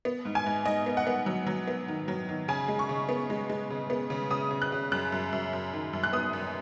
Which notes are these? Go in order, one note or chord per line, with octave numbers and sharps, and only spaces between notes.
B3
G#2
G#5
G#2
G#2 D#5
B3
F#5
B3
F#3
F#3
B3
D#3
F#3
D#3
C#3 G#5
G#3
C#6
C#3
B3
G#3
G#3
C#3
B3
C#3
C#3 D#6
C#3
F#6
C#3
F#2 F#6
F#2
F#2
F#2
D#3
F#2
F#6
B3 D#6
F#2